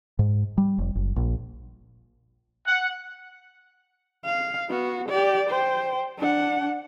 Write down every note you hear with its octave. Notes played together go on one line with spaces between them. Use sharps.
G#2
G3
F1
F#1
A#1
F#5
F5
B3 F#4
G4 D5
C5 G5
D4 F#5